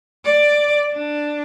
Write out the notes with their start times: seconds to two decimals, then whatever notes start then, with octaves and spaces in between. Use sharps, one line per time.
0.24 D5
0.92 D4